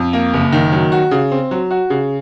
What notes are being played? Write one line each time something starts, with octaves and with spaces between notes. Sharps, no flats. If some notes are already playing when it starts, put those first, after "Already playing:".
Already playing: F2
A#3
F#1
D#3
F#3
F#4
C#3
C4
F#3
F#4
C#3